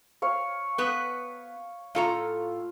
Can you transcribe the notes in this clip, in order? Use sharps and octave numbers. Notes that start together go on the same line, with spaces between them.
C#5 F5 C#6
B3 B4
A2 F4 A4 F5 A#5